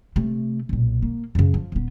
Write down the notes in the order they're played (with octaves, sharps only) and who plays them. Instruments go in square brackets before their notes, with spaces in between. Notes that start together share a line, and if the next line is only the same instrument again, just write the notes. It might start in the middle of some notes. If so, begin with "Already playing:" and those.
[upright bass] C3 A3
B1 A#2
A#3
F#2 C#3
F3
D#1 B3